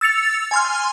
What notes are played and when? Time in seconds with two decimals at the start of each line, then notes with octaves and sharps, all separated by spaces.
0.01 E6 A6 C#7 F7
0.51 G#5 C6 F6